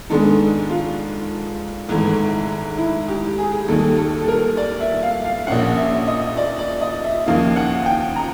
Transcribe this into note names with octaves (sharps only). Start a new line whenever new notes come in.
G#2 D#3 G#3 B3 D4 A4
F4
G#1 G#2 E3 A3
E4
G4
G#4
D#2 D#3 G3 A4
A4
A4
A#4
D5
E5
F5
F5
A#1 A#2 F3 A#3 C#4 F#5
E5
D#5
D5
D5
D#5
E5
D#2 C#3 F3 A#3 F5
F#5
G5
A#5